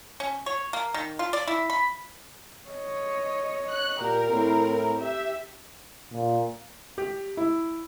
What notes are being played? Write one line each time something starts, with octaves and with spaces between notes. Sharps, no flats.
C#4
C#5
A#3
D#3
F4
D5
E4
B5
C#5 D#5
F#6
A#2 G4 A#4
A2 C4 E4
G4 E5
A#2
G4
E4